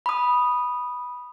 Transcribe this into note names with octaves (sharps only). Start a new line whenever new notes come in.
B5 D#6